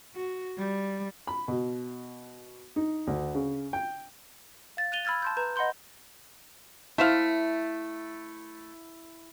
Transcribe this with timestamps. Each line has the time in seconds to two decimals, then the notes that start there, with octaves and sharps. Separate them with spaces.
0.15 F#4
0.58 G3
1.27 B5
1.48 B2
2.76 D#4
3.07 D2
3.35 C#3
3.73 G5
4.77 F5 A6
4.92 F#6 A6 D#7 F7 G7
5.05 B5 E6 F6 G#6 A6
5.22 A5 C6 G6
5.37 B4 A#5 G6 E7
5.56 D#5 F#5 B5 C6 G6
6.98 A3 E4 C5 F5